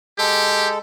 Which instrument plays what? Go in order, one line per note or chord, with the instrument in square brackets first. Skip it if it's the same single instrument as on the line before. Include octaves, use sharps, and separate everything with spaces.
[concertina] G#3 A4 [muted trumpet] G4